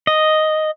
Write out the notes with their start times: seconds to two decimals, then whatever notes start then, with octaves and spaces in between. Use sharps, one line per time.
0.07 D#5